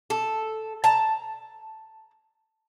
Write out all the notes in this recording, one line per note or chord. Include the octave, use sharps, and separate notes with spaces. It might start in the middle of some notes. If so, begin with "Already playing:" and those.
A4
A5 A#5